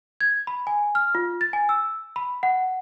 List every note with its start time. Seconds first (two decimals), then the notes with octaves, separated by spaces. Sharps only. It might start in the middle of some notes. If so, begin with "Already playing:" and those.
0.21 G#6
0.47 B5
0.67 G#5
0.95 F6
1.15 F4
1.41 A6
1.53 G#5
1.69 E6
2.16 B5
2.43 F#5